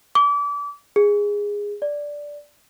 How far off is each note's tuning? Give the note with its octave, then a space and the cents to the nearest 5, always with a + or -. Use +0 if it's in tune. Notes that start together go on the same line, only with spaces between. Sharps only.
D6 -30
G#4 -15
D5 -5